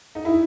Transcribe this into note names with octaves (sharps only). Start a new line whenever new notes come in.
D#4
E4